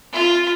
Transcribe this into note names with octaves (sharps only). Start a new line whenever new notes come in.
F4